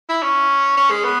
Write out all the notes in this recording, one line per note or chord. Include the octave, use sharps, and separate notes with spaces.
E4
C#4
C#4
G#3
B3